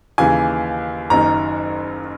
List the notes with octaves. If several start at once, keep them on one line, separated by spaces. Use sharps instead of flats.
D#2 C#3 E3 G#5
F#1 F#2 D#3 A#5